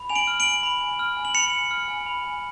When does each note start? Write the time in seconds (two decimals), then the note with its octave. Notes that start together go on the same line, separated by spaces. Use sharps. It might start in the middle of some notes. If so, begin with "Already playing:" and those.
Already playing: B5
0.10 G#5 F7
0.15 D7 F#7
0.27 F6
0.40 D7 F#7
0.46 G#5
0.63 B5
0.81 G#5
0.99 F6
1.17 G#5
1.25 F#7
1.35 B5 C#7 F7
1.53 G#5
1.71 F6
1.88 G#5
2.06 B5
2.24 G#5